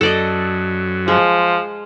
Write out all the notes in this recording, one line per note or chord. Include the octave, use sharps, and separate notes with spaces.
F#2 A4 D5 D#5
F3 G#3